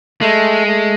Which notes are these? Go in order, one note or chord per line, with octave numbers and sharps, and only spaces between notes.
G#3 A3
A3